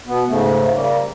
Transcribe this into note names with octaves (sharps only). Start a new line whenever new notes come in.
B2 B3
G#2 C#3 A3
C#3 G3 A#3